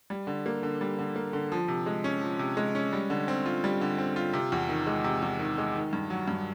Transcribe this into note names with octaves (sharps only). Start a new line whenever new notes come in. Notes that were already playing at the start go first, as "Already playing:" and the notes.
G3
D3
A#3
D3
G3
D3
A#3
D3
F3
C3
G#3
C#4
F3
C3
G#3
C#4
G3
D3
C4
F4
G3
D3
C4
F4
C3
E2
D#3
G#3
C3
E2
D#3
G#3
D#3
G2
F#3
G2